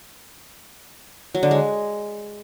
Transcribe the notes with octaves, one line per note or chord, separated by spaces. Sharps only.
F#3
D3
G#3